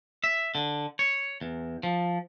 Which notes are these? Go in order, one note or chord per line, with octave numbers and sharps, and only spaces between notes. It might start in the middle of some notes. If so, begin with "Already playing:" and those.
E5
D3
C#5
E2
F3